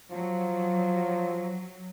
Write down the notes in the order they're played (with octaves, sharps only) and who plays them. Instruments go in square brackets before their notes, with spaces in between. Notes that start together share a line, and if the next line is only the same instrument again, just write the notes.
[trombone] F3 [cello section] F#3